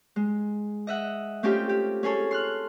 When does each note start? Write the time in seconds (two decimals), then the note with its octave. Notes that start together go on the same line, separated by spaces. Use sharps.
0.16 G#3
0.87 D#5 E5 F#5
1.43 A3 C4 C#4 F4 G4 G5
1.69 G4
2.03 C#4 G#4 A4 C#5
2.31 C6 F6 F#6